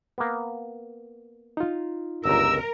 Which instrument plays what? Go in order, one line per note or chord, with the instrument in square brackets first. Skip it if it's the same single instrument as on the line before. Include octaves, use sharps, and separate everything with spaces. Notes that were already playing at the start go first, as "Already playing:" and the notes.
[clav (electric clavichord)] A#3 B3
[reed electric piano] D#4 F4
[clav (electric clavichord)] G1 C#2 [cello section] A#4 [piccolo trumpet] E6